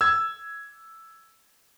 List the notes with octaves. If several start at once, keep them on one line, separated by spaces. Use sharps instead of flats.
E6 G#6